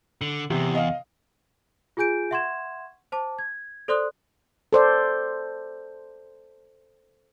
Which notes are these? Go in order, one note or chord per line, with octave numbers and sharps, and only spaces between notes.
D3
E2 C3
D#5 F5
F4 G#4 G#5 G6 D7
E5 F#5 C6 C#6 G#6 E7
C5 A5 D6
G#6
A4 C5 D5 C6 D#6 F#6
A4 C5 D5